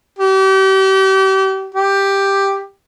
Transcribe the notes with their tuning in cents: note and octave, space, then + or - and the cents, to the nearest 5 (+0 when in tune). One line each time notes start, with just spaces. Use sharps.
G4 -35
G4 +5